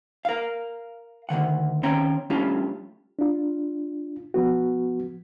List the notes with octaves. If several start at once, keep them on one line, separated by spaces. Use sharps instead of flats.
A#4 F5
D2 C3 D#3 F#5
D#3 C4 C#4 C#5 G5 A#5
G3 A3 C#4 D4 F4 G4
D4 F4
F3 B3 F#4